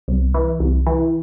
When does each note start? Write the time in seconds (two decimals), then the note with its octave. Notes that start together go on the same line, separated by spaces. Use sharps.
0.08 C2
0.34 E3
0.60 C2
0.87 E3